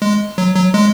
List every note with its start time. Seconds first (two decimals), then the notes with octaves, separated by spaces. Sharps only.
0.02 G#3
0.38 F#3
0.56 F#3
0.74 G#3